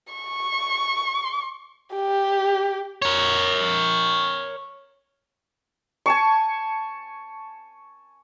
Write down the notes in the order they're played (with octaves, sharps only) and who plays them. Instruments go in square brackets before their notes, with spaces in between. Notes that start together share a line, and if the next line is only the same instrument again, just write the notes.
[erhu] C#6
G4
[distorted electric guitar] A#4 C#5
[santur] G#5 A5 C#6